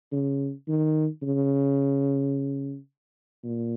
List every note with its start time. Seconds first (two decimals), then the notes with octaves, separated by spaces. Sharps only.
0.12 C#3
0.68 D#3
1.22 C#3
3.45 A#2